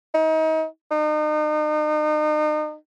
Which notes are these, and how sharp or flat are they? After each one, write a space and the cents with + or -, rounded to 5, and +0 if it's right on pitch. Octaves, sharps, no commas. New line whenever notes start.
D#4 +35
D#4 -40